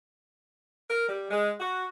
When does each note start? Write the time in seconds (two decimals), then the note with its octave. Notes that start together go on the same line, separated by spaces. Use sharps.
0.89 A#4
1.09 G3
1.31 G#3
1.60 F#4